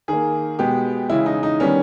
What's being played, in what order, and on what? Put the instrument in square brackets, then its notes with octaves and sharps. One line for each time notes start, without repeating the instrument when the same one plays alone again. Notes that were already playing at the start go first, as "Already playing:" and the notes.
[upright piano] D#3 A#3 G#4
B2 G#3 B3 G4
C#3 E3 G#3 E4
D#4
D#4
D#3 G3 B3 C#4